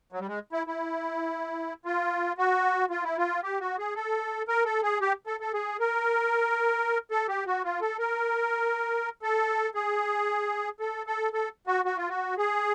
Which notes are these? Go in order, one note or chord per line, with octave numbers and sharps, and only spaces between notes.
F#3
G3
G#3
E4
E4
F4
F#4
F4
E4
F4
G4
F#4
G#4
A4
A#4
A4
G#4
G4
A4
A4
G#4
A#4
A4
G4
F#4
F4
A4
A#4
A4
G#4
A4
A4
A4
F#4
F#4
F4
F#4
G#4